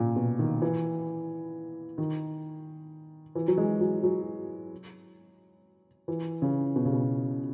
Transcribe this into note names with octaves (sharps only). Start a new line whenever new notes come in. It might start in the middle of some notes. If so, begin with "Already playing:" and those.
Already playing: A#2 C#3
B2
D#3
E3
D#3
E3
F#3
G#3
F#3
F#3
E3
C#3
B2
C#3
B2